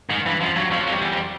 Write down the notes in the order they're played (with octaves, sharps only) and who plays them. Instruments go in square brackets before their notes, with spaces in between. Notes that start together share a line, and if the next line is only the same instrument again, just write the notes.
[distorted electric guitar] G#2 [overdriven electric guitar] D#3
[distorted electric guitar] G2 [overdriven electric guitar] E3
[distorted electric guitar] F#2 [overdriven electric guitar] F3
[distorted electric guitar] G2 [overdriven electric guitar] F#3
[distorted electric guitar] F2 [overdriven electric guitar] F3
[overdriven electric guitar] F#3
[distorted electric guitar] F2
[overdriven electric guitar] G3
[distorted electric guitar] E2
F2